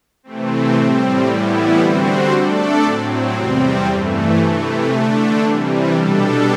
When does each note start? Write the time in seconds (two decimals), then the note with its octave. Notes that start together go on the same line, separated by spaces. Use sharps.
0.23 C3 E3 A3 C4
0.75 A2 G3 C4
1.26 A2 E3 G3 B3 E4
1.79 D3 G3 C4 F#4 C5
2.31 A3 D4 A4 D5
2.83 A2 F#3 C4
3.34 E2 C3 G3 C4
3.86 G2 E3 A3
4.38 C3 E3 A3
4.90 D3 A3 D4
5.42 C3 E3 G3
5.93 B2 G3 D4 A4